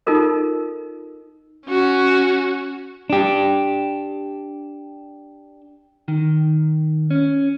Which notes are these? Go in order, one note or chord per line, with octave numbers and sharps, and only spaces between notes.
D#4 F4 A4 A#4 D#5
C#4 F#4
D4 G4
D#3
C#4